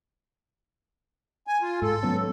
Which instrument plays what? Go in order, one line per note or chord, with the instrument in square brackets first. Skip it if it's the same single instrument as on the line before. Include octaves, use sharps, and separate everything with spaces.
[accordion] G#5
F4
[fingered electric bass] G#2 [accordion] A4
[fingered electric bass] F#3 B3 C#4